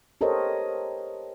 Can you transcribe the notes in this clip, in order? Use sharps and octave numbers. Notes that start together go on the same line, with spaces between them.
G4 A4 A#4 C5 C#5 D#5